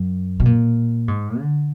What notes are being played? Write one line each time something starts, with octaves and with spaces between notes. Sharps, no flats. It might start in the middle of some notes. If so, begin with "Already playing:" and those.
Already playing: F#2
B2
A#2
G#2
D3